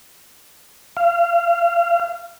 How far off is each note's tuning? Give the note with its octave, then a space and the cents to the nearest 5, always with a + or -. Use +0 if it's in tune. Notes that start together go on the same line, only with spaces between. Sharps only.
F5 -30